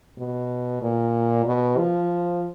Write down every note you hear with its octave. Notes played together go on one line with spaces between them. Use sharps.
B2
A#2
B2
F3